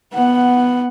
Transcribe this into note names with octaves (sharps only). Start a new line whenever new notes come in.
B3 F#5